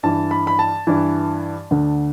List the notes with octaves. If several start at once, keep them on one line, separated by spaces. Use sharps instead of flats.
G2 E3 A5
B5
B5
A5
G2 E3
D2 D3